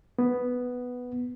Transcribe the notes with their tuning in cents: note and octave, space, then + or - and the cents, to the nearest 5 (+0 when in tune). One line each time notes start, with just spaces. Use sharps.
B3 +0